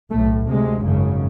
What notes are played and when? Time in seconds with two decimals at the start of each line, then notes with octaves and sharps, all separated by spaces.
0.11 B1 A2 A3
0.47 D2 C3 G#3
0.83 G#1 F#2 C#3